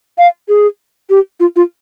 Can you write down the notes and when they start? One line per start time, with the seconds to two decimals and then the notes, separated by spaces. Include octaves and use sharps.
0.18 F5
0.48 G#4
1.10 G4
1.40 F4
1.56 F4